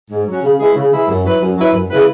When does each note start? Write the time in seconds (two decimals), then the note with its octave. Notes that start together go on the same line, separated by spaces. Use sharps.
0.10 G#2
0.27 F#3 C#4 F#4
0.42 C#3
0.59 E3 G#3 E4 G#4
0.76 C#3
0.91 E3 G#3 E4 G#4
1.08 F#2
1.24 F#3 E4 B4
1.41 F#2
1.57 F#3 E4 B4
1.73 F#2
1.90 C#3 G#3 E4 B4